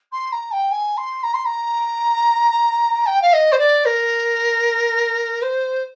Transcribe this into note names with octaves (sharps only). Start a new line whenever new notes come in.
C6
A#5
G5
G#5
C6
A#5
C6
A#5
G5
F5
D#5
C5
D5
A#4
C5